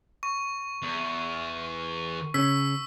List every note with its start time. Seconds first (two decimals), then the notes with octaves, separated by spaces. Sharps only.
0.23 C#6
0.82 E2
2.34 C#3 C#4 E6 B6